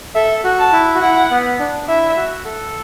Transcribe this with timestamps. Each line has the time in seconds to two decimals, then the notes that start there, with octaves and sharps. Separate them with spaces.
0.15 A4 E5
0.44 F#4
0.59 A5
0.72 E4
0.95 F#4
1.01 E4 F#5
1.31 B3
1.59 D4
1.88 E4 E5
2.17 F#4
2.45 A4